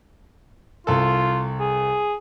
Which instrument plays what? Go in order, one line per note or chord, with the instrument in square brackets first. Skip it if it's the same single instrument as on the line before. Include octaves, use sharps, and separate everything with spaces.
[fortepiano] C2 A4 [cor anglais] F4
[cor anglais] G#4